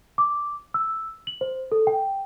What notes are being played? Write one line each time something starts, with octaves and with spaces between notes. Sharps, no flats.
D6
E6
F#7
C5
A4
G5